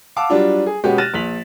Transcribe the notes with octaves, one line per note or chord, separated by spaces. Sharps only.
F5 F#5 A5 D6 E6
F#3 G3 D4 F4
G#4
B2 G#3 B3 C#4 F#4 G4
F6 F#6 A6 A#6 D#7 E7
A#1 B6 F7 F#7